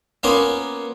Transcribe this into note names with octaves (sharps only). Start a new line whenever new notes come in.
A#3 B3 C#4 F4